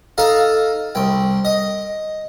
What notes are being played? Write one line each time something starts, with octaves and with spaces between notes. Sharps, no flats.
D#4 A4 F5
C2 G5
D#5